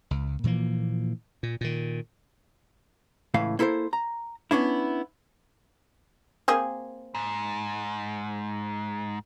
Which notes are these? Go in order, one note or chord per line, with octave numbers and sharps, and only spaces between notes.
C#2
A#2 E3 F3 A#3
A#2
A#2 D#3
C#2 A2 E3 E4 F5
A#3 E4 A4 A#4 C5
A#5
B3 C#4 D4 E4
A#3 C4 G#4
G#2